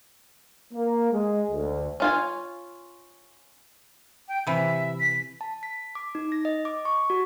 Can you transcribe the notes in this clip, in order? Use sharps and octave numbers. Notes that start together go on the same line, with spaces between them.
A#3
G#3
D2
C#4 F4 G#5
G5
C3 E3 E5
B6
A5
B6
D6
D#4
A#6
D#5
D6
C#6
F#4